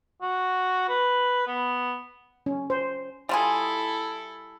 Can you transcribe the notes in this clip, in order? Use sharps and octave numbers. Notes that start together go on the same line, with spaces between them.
F#4
B4
B3
C#4
C5
G3 E4 F4 G#4 A4